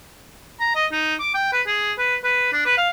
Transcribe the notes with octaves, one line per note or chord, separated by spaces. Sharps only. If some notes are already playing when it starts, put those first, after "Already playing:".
A#5
D#5
D#4
D6
G5
B4
G#4
B4
B4
D4
B4
F5